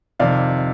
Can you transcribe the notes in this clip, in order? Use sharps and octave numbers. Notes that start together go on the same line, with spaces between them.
F2 C3 D#3 D5 F5